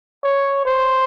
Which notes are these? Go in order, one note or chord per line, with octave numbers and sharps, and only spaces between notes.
C#5
C5